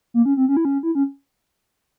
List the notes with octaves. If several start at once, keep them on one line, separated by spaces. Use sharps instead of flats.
A#3
C#4
C4
C#4
E4
C#4
E4
C#4